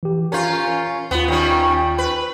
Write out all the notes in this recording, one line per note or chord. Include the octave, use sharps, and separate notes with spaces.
E3 G4
C#4 F4 A#4 A#5 G6
D#2 B3 F4
D#3 G3 C#4
B4